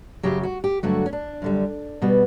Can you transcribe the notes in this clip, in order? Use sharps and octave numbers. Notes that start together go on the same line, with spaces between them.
F#2 C#3 F#3 G4
F#4
G4
G2 D3 F#3 A3 F#4
C#4
D4
F#2 D3 G3
B2 G3 B3